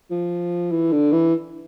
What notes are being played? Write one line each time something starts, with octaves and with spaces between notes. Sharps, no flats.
F3
E3
D3
E3